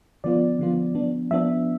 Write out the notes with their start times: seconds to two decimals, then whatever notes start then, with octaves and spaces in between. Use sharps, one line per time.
0.24 D3 F3 B3 F4 D5
0.59 D3 F3 B3 F4
0.95 F3 B3 D4
1.31 F3 B3 D4 E5